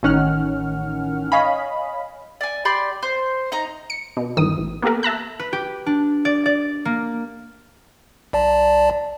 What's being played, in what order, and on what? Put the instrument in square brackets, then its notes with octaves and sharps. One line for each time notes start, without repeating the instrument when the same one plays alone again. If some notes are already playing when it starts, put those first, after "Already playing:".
[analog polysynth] A1 D#3 C#4 F#5 F6
C#5 D#5 F5 G#5 B5
[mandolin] D5 G#5
G4 D5 B5 C6
C5
D#4 D#5 A#5
[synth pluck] C#7
B2
G1 D#2 D#3 E3 D#6
A1
A#3 B3 G4 A4 A#4
E5 A5 A#5 F#6
[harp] B4
G4
D4
D5
D5
A#3
[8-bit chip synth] B1 D5 A5